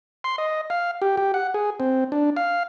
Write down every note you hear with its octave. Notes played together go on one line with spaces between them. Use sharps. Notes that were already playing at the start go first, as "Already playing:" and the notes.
C6
D#5
F5
G4
G4
F#5
G#4
C4
D4
F5